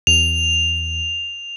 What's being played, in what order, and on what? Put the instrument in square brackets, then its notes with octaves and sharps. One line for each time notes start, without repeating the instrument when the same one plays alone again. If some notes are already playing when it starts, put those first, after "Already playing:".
[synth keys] E2 [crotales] F7